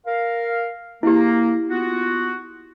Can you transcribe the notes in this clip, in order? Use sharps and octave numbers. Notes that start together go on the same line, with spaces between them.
A#4 F5
A#3 E4 G4
B3 F4 F#4